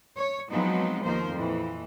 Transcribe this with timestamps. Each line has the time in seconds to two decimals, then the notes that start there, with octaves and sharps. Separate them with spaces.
0.17 C#5
0.51 F3 F#3 G#3 B3 C4 D#4
1.03 D#2 D#3 F3 A#4 C5
1.33 F2 A#2 E3